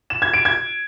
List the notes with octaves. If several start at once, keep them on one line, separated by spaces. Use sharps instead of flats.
E7
G#6
D7
G#6